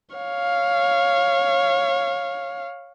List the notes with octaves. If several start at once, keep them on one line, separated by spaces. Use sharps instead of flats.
C#5 F5